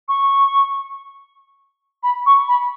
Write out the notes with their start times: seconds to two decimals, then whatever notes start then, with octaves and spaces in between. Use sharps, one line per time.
0.08 C#6
2.03 B5
2.26 C#6
2.48 B5